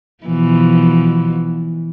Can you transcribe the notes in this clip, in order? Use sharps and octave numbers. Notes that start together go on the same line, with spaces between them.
B2 E3 F3